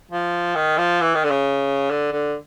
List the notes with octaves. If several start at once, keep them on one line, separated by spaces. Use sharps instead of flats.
F3
D#3
F3
E3
D#3
D3
C#3
D3
D3